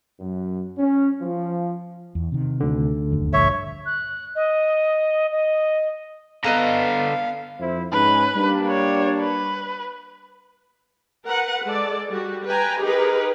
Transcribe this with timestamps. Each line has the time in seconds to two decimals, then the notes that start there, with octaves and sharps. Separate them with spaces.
0.20 F#2
0.78 C#4
1.21 F3
2.15 E2
2.32 C3 D#3
2.60 D2 D3
3.12 F#1 D#2
3.33 A#1 G2 C#5 E5
3.86 F#6
4.36 D#5
5.32 D#5
6.44 D3 B3 A4 B4 D#5 F5 A#5
7.60 F2 E4 C5
7.92 G#2 C#4 B4
8.36 G3 A#3 D4
8.68 C#5
9.20 B4
11.26 A#4 B4 F#5
11.63 G#3 A4 D5
12.08 G3 F#4
12.46 B4 G5 G#5 A#5
12.81 D#4 G4 G#4 A#4 B4